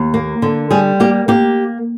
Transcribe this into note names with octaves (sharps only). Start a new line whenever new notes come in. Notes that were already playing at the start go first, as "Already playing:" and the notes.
Already playing: D#2
A#3
D3
G3 G#4
A#3 G4
A#3 G4